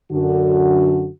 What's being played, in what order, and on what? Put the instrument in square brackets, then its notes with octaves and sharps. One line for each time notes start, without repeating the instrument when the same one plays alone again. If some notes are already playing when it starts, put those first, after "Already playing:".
[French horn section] F#2 D3 F#4